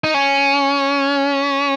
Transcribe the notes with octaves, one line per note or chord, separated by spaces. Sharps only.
D#4
C#4